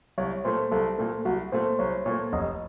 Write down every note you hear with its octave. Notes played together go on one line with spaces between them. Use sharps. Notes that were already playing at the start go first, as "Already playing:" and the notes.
C2 C#5
A#2 A3 C5
C2 A4
A#2 A3
C2 F#4
A#2 A3 C5
C2 C#5
A#2 C#5
A3
F1 D#5